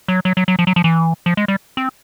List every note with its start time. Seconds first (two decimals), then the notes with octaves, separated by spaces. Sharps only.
0.08 F#3
0.25 F#3
0.37 F#3
0.48 F#3
0.59 F3
0.67 F#3
0.76 F3
0.84 E3
1.26 F3
1.37 G#3
1.48 G3
1.77 C4